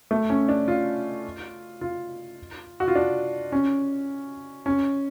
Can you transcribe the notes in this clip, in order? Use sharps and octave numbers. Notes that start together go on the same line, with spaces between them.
A3
C#4
D4
F4
F4
F#4
F4
D4
C#4
C#4